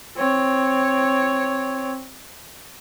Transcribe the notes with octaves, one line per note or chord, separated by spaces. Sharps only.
C4 C#5